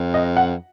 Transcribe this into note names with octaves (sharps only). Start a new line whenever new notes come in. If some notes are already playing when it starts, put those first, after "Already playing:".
Already playing: F2
D#5
F#5